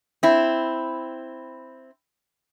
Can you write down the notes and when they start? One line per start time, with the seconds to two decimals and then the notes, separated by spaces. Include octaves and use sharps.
0.23 C4 E4